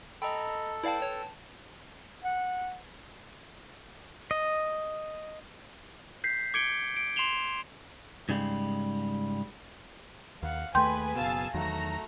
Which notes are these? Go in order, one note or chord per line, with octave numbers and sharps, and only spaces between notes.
A4 D#5 G5 A#5 B5 E6
E4 B4 D5 F5 G5 A5
C#5
F#5
D#5
G6 B6 C7
D6 G#6 C#7 D7 G7
D7
C6 C7 E7 F7 G7
G#2 C#3 G3 G#3
D#2 F5 F#5
D#2 A3 G#4 B4 G5 G#5 C6 G6
F#1 B2 F5 A5 E6
E2 D#3 F#3 A3 F#4 A#5